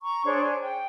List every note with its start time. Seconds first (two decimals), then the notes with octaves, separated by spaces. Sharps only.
0.01 A#5 C#6
0.24 D4 G#4 C5 C#5
0.42 G#5
0.62 G5